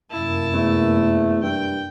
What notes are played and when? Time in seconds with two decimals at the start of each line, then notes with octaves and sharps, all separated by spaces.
0.11 F1 F#2 A#3 E4 A5
0.54 E2 A3
1.43 G2 G5